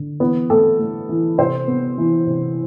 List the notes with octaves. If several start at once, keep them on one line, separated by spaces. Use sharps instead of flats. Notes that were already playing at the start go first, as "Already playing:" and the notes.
Already playing: D3
E3 B3 B4
A3 C4 A4
A3
E3
C3 C4 C5
B3
E3
C3